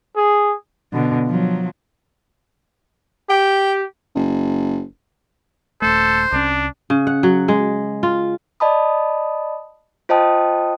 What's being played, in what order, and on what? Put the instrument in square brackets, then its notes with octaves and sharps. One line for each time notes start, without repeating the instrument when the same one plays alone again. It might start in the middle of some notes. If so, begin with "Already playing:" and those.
[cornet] G#4
[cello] B2 D3
F3 F#3
[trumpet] G4 [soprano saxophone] G5
[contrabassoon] F#1
[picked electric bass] D#1 A3 [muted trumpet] A4 [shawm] C5
[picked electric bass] C2 C#4 [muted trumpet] D4
[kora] C#3
F#5
F#3
G#3
F4
[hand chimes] D5 D#5 A5 B5 D#6
F4 C5 D#5 G5 A5 D#6